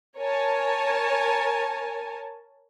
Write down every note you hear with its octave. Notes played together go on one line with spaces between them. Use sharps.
A#4 C#5 G#5 A5